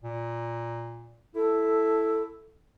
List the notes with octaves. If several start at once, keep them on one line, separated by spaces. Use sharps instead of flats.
A#2
E4 A4